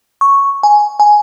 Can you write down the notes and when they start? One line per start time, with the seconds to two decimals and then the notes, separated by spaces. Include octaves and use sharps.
0.21 C#6
0.63 G#5
1.00 G#5